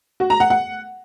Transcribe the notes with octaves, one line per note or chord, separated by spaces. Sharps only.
F#4
A#5
F#5
F#5